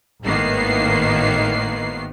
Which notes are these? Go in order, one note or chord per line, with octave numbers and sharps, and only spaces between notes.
G#1 A2 D#3 A#3 B3 C7